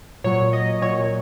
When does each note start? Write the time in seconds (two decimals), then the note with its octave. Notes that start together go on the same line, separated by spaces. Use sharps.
0.24 A#2 F#3 C#5
0.53 D#5
0.82 A#2 F#3 C#5